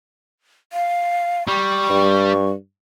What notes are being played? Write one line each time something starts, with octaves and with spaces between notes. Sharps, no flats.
F5
G3 C#6
G2